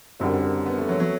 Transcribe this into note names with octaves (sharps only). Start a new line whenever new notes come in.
F#1 F#2 D3 G3 C4
B3
A3
F#3
F#3